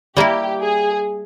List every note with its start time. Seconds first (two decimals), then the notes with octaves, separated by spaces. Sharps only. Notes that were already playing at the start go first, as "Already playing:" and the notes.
0.16 G3 A#3 E4 G4
0.61 G#4